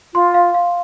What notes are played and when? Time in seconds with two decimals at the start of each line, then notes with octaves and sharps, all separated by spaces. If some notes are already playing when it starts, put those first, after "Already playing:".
0.14 F4 C6
0.34 F5
0.54 F5